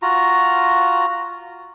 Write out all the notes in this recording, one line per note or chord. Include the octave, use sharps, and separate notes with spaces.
F4 F#4 A#5